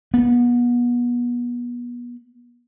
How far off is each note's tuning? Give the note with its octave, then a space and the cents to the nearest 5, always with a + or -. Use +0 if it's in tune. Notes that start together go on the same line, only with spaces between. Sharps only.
B3 -30